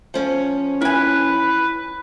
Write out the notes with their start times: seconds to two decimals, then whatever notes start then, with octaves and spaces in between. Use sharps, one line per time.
0.14 F3 C#4 C#5
0.81 E4 B4 G#5